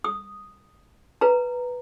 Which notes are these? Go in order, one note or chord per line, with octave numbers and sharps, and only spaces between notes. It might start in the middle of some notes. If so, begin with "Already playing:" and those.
D#6
B4 A#5